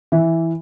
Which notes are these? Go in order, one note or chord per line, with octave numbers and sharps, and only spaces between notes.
E3